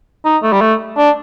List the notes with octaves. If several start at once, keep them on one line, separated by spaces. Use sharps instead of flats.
D#4
A3
G3
A3
D4